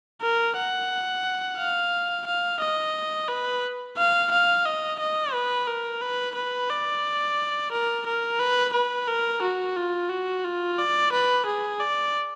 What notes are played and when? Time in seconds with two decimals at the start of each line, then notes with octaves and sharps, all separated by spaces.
0.22 A#4
0.57 F#5
1.58 F5
2.26 F5
2.60 D#5
3.29 B4
3.97 F5
4.32 F5
4.66 D#5
5.00 D#5
5.33 B4
5.67 A#4
6.02 B4
6.35 B4
6.70 D5
7.72 A#4
8.06 A#4
8.40 B4
8.73 B4
9.08 A#4
9.42 F#4
9.76 F4
10.09 F#4
10.44 F4
10.79 D5
11.12 B4
11.46 G#4
11.80 D5